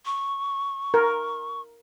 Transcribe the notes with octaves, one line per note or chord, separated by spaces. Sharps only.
C#6
A#4